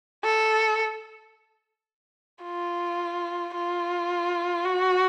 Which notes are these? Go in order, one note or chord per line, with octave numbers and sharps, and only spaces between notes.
A4
F4
F4
F#4